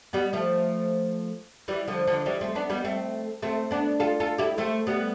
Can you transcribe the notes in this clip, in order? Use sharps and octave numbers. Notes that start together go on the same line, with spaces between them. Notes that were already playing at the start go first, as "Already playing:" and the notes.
G3 B3
F3 A3
E3 G3
D3 F3
D3 F3
E3 G3
A3 C4
B3 D4
G3 B3
A3 C4
A3 C4
B3 D4
F4 A4
F4 A4
E4 G4
A3 C4
G3 B3